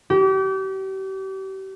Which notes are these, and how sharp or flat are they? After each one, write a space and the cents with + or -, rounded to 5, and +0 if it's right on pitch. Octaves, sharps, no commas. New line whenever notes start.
G4 -35